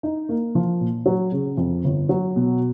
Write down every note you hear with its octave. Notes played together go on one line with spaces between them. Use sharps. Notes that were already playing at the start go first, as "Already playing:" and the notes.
D#4
A#3
F3
A#2
F#3
C#3
F2
G1
F#3
B2